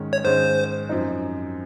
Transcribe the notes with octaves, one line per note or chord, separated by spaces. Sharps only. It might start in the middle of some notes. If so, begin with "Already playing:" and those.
Already playing: G#2 D#3 G#3 C#4
C#5
G#2 D#3 G#3 C#4 C5
F#2 F3 C4 D#4